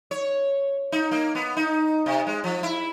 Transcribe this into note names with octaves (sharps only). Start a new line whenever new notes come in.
C#5
D#4
A#3
B3
D#4
C3
G#3
F3
E4